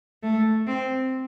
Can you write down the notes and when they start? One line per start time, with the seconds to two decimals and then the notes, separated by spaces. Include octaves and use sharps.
0.23 A3
0.67 C4